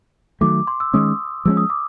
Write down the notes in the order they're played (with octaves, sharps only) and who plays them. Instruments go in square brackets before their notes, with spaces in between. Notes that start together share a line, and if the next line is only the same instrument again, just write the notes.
[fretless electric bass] D#3 F#3 A3 [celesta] D6
[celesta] C6
E6
[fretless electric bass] D#3 G#3 C#4 [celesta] D#6
[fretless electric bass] F3 G#3 C#4 [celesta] E6
[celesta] D#6
D6